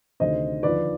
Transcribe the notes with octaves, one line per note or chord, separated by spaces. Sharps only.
D2 C3 D#3 C5 D#5
D#2 D3 F3 B4 D5